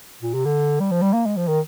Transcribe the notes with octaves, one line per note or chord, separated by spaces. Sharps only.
A#2
C3
D3
G3
F3
G3
A#3
G#3
F3
D#3